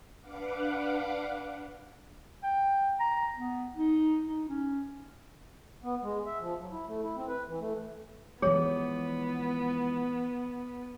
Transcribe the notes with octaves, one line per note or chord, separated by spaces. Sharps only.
D4 B4 F5 F#5 D6
G5
A#5
B3
D#4
D#4
C#4
B3
G#3
E5
F3
F#3
E4
A3
E4
C4
B4
E3
A3
E3 F3 G#3 B3 G#4 C#5